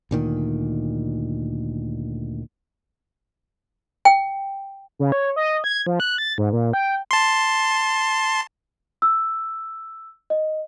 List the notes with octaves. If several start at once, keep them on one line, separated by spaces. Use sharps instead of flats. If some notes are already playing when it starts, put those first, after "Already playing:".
D2 A#2 D#3
G5
C#3
C#5
D#5
G#6
F3
F#6
A6
G#2
A#2
G5
A5 C6
E6
D#5